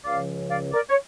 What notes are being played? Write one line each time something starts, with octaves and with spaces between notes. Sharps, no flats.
C#2 C#3 F3 C#4 D5 F5
D5 F5
A#4 D5
C#5